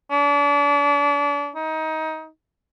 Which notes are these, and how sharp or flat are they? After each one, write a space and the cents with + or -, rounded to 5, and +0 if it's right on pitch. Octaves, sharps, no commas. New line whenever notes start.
D4 -35
D#4 +25